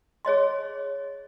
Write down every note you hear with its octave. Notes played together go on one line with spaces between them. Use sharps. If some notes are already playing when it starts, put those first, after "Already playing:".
G#4 C#5 D#5 C6